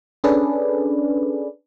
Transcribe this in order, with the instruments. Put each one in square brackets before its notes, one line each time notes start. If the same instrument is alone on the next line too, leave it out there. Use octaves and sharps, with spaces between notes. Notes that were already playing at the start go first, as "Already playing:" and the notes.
[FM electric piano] C#4 D4 G#4 A4 B4 D5